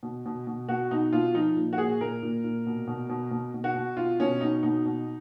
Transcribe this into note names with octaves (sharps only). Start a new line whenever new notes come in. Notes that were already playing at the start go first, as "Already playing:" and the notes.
B2
B2
B2
B2 F#4
B2 D#4
B2 F4
F3 D#4
A#2
F#4
A#2 G#4
A#2 A#4
A#2
A#2
B2
B2
B2
B2
B2
F#4
B2
B2 F4
B2 C#4
B2 D#4
B2 D#4
B2